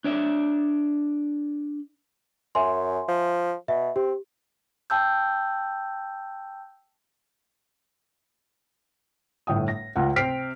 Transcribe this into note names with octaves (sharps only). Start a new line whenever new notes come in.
D4 C#5 D5 E5
F#2 E5 G#5 C6
F3
B2 E5
C4 G4
G5 A5 E6 G6
G1 A2 G5 D#6
A#6
C#2 F4 F#5
C3 C4 F6 B6 C7 D7